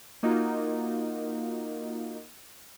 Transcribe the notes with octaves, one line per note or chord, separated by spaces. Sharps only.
A#3 D#4 F4 F#4